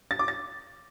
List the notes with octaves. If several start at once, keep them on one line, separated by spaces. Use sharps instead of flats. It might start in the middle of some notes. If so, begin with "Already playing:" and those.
A6
D6
A6